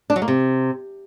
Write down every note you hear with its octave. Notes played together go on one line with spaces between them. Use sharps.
D4
F#3
A#3
C3